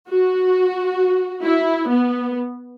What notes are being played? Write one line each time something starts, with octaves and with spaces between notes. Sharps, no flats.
F#4
E4
B3